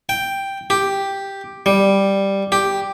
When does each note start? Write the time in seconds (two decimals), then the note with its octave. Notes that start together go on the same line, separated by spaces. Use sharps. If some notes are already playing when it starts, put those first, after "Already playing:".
0.09 G5
0.70 G4
1.66 G3
2.52 G4